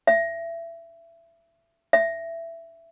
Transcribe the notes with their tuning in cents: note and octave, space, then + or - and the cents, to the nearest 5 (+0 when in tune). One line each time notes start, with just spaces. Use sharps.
E5 +25
E5 +15